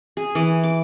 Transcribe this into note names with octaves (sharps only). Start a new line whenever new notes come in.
G#4
E3
D6